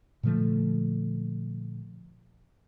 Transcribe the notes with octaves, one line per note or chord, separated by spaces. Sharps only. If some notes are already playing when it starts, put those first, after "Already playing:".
A#2 D3 F3 A3